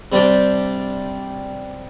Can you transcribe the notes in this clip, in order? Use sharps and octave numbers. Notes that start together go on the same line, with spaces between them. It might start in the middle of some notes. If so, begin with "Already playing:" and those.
C3 G3 D4 G4